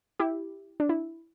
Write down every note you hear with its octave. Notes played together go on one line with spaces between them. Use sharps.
E4 G4
D4
E4